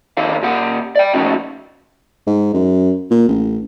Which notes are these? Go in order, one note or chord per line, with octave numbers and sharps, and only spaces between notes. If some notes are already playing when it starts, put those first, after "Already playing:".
E2 D#3 D#4 A4 F5
A#2 G4 F#5
D5 G5
B2 F3 A3 C#4 D#4 F#4
G#2
F#2
A#2
A1